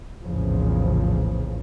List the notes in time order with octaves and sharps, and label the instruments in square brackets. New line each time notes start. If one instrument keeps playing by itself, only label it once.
[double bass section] A#1 E2 A2 C#3 F3